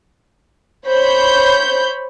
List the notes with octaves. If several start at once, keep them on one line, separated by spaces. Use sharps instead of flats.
C5 C#5 B5 G6